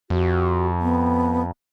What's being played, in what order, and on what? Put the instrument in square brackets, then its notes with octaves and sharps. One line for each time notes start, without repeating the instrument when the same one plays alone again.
[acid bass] F2 [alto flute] F#4
[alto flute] B3